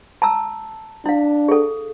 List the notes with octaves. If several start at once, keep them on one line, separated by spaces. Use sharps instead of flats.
A5 A#5 E6
D4 E4 F5
G#4 A4